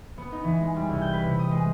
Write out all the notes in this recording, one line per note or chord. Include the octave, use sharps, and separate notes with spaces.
B3
D#4
E3
G#3
G3
C2
G6
B4
C3
D#6
G#3